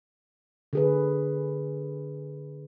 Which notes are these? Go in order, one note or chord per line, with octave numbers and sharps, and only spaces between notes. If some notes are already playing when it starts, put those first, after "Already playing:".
D3 G#4 B4